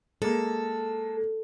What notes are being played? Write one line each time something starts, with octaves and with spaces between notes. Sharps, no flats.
G#3 A#3 A4